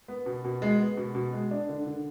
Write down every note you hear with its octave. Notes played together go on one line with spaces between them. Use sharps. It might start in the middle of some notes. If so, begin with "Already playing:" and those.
B3
B2
B2
G#3
B3
B2
B2
G#3
D4
D3
D3